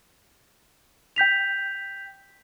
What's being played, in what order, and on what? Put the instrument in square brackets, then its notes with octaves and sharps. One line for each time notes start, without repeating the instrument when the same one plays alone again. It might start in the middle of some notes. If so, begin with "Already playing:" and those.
[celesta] G5 G6 B6 F7